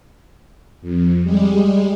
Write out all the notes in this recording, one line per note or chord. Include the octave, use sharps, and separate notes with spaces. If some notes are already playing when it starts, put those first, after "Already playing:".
F2
G3 G#3